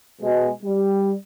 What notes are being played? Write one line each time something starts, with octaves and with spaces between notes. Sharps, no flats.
B2 G#3
G3